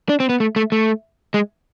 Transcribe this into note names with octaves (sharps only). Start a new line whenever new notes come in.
D4
C4
B3
A3
A3
A3
G#3